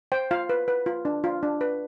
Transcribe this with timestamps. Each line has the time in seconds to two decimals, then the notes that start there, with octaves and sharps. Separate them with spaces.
0.12 C5 G5
0.31 F4 F5
0.49 B4
0.68 B4
0.86 F4
1.05 D4
1.24 F4
1.43 D4
1.61 B4